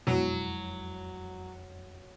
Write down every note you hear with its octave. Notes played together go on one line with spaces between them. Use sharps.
F2 B2 F#3 G#3 E4 F#4